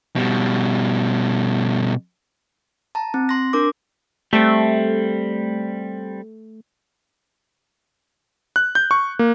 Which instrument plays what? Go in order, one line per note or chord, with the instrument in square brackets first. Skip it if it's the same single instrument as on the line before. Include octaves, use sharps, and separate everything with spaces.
[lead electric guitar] B2 G3
[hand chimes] A5 A#5
C4
C6 A#6
D4 A#4 D6
[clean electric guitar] G3 C4 [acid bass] A3
[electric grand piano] F#6
G6
C#6
A#3